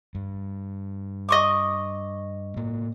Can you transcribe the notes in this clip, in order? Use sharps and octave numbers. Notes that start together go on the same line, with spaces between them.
G2
D#5 C#6 D6
A2 A#3